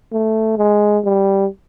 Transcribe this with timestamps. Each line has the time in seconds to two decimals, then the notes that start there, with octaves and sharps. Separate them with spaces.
0.12 A3
0.57 G#3
1.04 G3